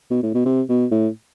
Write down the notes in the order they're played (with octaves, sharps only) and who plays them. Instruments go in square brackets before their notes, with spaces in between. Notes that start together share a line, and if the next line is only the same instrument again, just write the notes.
[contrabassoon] B2
A2
B2
C3
B2
A2